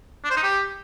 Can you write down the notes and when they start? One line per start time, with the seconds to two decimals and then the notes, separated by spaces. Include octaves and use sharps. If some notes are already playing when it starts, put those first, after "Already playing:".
0.24 D4
0.30 C5
0.37 D#4
0.43 G4